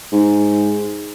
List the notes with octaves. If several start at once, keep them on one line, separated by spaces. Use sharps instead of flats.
G#2